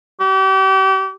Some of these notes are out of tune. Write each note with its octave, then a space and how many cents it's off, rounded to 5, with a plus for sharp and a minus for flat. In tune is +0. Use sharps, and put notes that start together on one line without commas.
G4 -35